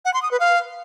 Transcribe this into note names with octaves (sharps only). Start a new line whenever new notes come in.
F#5
C6
D#6
B4
F5